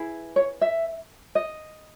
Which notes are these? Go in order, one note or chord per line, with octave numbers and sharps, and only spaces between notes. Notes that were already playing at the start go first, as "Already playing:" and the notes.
Already playing: E4 G#4 B4
C#5
E5
D#5